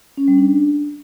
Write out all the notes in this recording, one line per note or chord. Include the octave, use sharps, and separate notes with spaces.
C#4
G3
D4